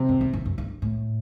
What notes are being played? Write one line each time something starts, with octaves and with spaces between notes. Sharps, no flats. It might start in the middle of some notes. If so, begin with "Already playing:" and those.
Already playing: C3
F#2
E2
F#2
F#2
G2
A2